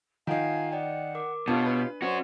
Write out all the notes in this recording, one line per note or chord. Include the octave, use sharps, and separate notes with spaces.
D#3 D#4 F4 F5 F#5 G#5 A#5
D5 D#5 F#5 G5
A#4 D6
B2 D4 F4 G4 C#5 A5
B4
C#4 F#4 C5 D5 C#6